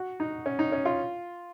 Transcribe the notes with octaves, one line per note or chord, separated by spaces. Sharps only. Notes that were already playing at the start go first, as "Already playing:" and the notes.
Already playing: F#4
D#4
C#4
D#4
C#4
F4